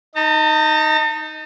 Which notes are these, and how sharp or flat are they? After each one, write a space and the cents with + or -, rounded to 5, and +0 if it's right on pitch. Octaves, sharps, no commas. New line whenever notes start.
D#4 +5 A5 +45